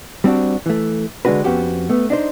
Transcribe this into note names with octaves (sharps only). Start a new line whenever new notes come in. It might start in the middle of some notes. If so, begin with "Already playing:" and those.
G3 C4 D4 F#4
E3 A3
D3 G#3 A3 D4 F#4 B4
F2 B3 C#4 F#4 G4
A3 B3
D4 D#4 C5